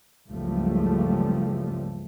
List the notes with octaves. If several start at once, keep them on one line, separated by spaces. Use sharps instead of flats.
F#1 C#2 G2 F3 G3 A3